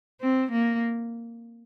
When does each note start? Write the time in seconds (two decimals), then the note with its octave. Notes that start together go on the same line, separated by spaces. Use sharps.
0.21 C4
0.51 A#3